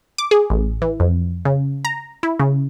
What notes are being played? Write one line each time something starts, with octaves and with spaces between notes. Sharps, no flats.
D6
G#4
A1
E3
F2
C#3
A#5
E4
C#3